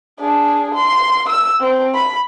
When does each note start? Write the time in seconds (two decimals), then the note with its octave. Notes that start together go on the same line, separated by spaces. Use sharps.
0.19 D4 G#4
0.75 C6
1.29 E6
1.60 C4
1.94 B5